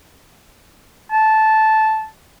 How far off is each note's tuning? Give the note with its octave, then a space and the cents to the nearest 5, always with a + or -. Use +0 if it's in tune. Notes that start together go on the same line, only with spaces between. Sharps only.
A5 -10